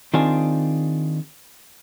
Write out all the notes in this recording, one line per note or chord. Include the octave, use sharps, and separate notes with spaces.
D#3 C4 D4 F4 G#4